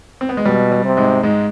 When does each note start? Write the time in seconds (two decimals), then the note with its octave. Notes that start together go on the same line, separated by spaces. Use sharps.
0.21 C4
0.29 B3
0.37 G#3
0.45 B2 G3
0.72 G3
0.84 C3
0.97 G#2 G#3
1.23 G#2 G#3